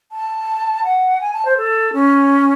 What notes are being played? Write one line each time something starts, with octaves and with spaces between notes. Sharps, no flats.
A5
F#5
G#5
A5
C5
A4
C#4